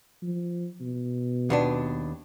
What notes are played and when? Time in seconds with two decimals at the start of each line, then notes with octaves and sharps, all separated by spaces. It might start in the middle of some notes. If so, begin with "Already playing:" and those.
0.22 F3
0.81 B2
1.50 D#2 B3 D4